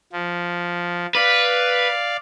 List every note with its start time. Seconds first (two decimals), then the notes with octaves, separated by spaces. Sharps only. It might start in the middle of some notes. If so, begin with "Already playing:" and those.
0.13 F3
1.15 B4 D5 F5